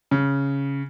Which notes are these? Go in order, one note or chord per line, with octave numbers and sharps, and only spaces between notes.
C#3